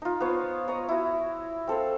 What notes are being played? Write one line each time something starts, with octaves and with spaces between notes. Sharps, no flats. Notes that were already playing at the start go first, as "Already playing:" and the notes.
D#4 F4
B3 C5 C#5
C#5 D#5 A#5
E4 F#4
C4 A4 C5 F5